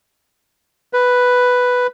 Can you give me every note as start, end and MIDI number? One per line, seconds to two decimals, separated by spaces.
0.93 1.87 71